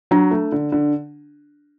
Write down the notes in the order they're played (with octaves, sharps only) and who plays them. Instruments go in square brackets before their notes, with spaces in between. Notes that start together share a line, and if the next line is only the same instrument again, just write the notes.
[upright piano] F#3 [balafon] D4
[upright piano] A3
D3
D3